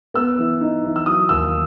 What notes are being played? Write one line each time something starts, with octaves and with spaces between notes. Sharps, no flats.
B3 E6
E3
D#4
E3
E6
F#3 D#6
D#2 E6